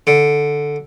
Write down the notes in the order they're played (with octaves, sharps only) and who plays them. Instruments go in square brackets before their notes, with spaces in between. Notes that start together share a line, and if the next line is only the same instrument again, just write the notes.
[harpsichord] D3